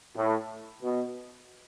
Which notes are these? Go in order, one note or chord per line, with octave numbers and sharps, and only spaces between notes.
A2
B2